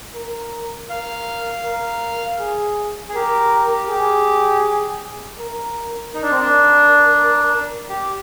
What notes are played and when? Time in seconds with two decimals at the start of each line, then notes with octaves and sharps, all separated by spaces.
0.15 A#4
0.90 A#4 F5
1.65 A#4
2.40 G#4
3.09 G#4
3.15 G4 A#4
3.89 G4 G#4
5.39 A#4
6.14 D#4 A#4
6.22 D4
6.31 C4
6.40 D4
7.89 G4